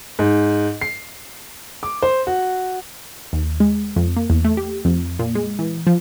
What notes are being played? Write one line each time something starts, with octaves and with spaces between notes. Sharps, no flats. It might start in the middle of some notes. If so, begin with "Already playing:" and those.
G#2
C7
D6
C5
F#4
D#2
G#3
F2
A#3
E2
A3
G4
F2
A#2
G#3
E3
F3